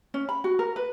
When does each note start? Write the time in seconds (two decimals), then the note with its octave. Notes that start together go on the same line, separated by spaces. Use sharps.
0.14 C#4
0.29 B5
0.44 F#4
0.59 A#4
0.76 B4